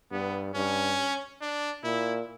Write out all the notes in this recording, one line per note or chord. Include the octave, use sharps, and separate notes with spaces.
G2 B3
G2 C#4
D4
A#2 E4